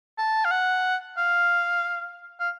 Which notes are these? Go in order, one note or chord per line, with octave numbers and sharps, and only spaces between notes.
A5
F5
F#5
F5
F5